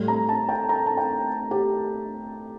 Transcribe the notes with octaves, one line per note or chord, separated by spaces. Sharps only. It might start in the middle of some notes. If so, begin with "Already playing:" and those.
Already playing: A2 G3
A#5
A5
G5
A#5
A5
G5
G4